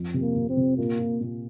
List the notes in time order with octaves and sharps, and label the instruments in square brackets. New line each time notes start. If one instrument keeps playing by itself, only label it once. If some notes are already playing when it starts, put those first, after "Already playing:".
Already playing: [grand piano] F2
C3
[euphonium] A#3
[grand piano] C3
[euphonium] C4
[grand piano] C3
[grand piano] A#2 [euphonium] A#3
[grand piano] A#2
A#2